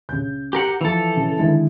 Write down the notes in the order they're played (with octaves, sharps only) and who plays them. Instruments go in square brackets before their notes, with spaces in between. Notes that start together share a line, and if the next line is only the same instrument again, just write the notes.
[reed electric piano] C#2 [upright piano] C#3 G6
[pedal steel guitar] G4 A#4 F#5
[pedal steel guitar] E3 A4 [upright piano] F3
[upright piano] C#3
[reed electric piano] D3 D#3 G#3 [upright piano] E4